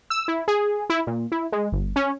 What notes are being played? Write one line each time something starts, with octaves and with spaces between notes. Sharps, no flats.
E6
E4
G#4
E4
A#2
E4
G#3
G1
C#4